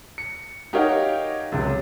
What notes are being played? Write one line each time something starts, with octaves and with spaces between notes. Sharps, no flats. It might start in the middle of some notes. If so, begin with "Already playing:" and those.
C#7
D#4 G4 A#4 C#5 F5 F#5
C#2 F#2 C3